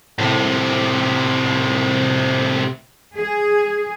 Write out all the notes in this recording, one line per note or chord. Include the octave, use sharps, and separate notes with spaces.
A2 C3
G#4